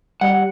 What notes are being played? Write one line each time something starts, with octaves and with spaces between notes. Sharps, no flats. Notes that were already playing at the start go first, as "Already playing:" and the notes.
G3 F#5